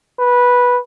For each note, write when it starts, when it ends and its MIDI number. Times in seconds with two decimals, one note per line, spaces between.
0.19 0.79 71